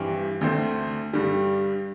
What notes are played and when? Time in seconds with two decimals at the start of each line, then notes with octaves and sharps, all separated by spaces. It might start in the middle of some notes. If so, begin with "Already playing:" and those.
Already playing: G2 E3 C4 G4
0.41 D2 D3 A3 C4
1.13 G2 D3 G3